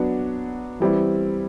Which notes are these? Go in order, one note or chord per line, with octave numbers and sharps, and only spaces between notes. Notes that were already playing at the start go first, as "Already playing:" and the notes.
Already playing: F#3 B3 D4
E3 G3 C4 E4